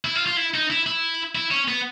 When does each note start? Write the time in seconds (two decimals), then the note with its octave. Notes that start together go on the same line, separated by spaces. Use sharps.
0.05 E4
0.16 F4
0.27 F4
0.37 E4
0.54 D#4
0.70 E4
0.87 E4
1.35 E4
1.51 C#4
1.68 B3